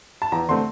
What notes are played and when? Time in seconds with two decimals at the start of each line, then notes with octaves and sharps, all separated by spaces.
0.22 A5
0.32 E2 A#5
0.48 D3 A3 C4 C6